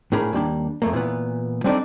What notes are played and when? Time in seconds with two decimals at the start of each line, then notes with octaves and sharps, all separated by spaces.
0.12 A2 D4 G#4 A#4 B5
0.33 D#2 G3 A#3 D4
0.82 F2 A3 A#3
0.93 A#2 E3 B3
1.64 G3 C4 D4 D#4 A4 D5